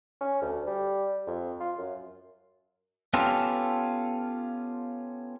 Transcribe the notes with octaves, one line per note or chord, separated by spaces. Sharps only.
C#4
D2
G3
F2
F4
F#2
B3 C#4 F4 G4 A4